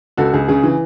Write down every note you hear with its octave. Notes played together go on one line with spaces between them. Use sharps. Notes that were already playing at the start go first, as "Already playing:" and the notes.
C#2 F#4 A4
C#2 G#4
C#3 G#4
E3